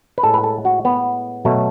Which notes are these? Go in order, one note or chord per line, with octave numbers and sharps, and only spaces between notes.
B4
A2 G#3 A4
B4
A4
F#4
B3
B2 F#3 A3